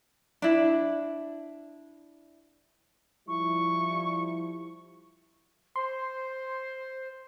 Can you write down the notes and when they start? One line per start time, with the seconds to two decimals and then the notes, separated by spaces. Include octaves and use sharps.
0.42 D4 E4
3.28 F3 G3 E4 C#6
5.76 C5 C6